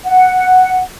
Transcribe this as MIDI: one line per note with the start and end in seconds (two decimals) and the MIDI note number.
0.06 0.81 78